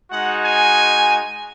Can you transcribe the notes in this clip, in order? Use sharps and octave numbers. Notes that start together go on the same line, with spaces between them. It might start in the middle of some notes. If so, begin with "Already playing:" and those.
G#3 D#4 F#4 F#5
G#5